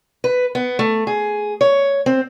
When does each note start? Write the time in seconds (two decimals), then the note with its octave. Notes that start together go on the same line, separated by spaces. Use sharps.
0.24 B4
0.55 B3
0.79 A3
1.07 G#4
1.61 C#5
2.06 C4